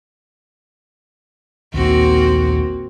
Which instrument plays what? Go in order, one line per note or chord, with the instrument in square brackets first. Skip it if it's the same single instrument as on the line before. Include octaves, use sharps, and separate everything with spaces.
[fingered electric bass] A#1 D#2 [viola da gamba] A#3 C4 F#4